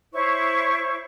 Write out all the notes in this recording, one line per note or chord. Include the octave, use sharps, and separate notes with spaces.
E4 C5 C#5 C#6